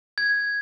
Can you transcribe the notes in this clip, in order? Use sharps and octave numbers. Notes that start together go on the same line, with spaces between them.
G#6